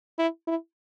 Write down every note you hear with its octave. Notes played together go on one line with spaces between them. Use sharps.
E4
E4